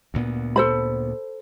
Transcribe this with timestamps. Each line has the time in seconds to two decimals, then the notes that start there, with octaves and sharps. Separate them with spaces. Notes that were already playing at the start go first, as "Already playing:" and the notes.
0.14 D2 A#2 B3
0.56 A4 C5 B5